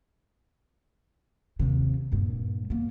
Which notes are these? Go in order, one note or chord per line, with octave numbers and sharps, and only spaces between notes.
D#2 C3
G2 A#2
A#3 B3